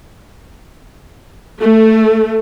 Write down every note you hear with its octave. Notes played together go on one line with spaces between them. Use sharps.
A3